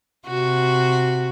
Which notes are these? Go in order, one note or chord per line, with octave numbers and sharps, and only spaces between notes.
C3 F#4